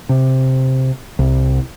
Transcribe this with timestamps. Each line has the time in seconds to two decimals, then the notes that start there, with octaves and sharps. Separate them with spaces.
0.09 C3
1.19 C2